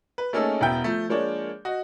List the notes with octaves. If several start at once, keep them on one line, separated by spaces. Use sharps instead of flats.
B4
A3 A#3 C#4 D#4 G#4 A4
E1 B3 E4 E5 G5 G6
F3 A3
F3 G#3 A#3 D4 C#5
F#4 D#5